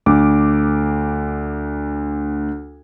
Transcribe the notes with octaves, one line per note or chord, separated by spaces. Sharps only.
D2 D6